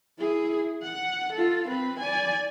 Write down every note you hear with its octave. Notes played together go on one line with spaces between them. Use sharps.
E4 G#4
F#5
F4 A4
C4 B4
D5 G#5